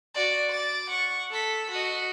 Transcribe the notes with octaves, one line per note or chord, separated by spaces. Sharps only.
F#4 D5
D6 A6
F#5 C#6
A4 B6
F#4 D#5